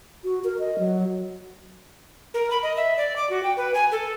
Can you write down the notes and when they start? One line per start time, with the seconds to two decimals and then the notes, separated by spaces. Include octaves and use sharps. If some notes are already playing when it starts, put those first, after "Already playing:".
0.24 F#4
0.44 A#4
0.59 D#5
0.79 F#3
2.34 A#4
2.51 B5
2.63 D#5
2.77 E5
2.97 D5
3.16 D6
3.30 F#4
3.43 G5
3.57 B4
3.74 G#5
3.92 A4